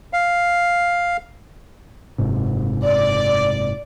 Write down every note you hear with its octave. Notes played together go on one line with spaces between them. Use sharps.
F5
F#1 G#2 C3
D5